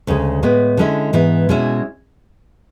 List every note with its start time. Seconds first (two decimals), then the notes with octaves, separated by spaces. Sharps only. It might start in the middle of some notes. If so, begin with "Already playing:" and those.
0.07 D2 C#3 G#3
0.43 A2 G#3 B3
0.77 D3 G#3 C#4 E4
1.13 G#2 E3 B3 E4
1.49 B2 G#3 C#4 E4